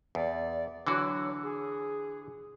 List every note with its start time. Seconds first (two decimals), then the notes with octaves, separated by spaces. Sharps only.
0.15 E2 D5
0.87 D3 E3 F#3 F#4
1.43 G#4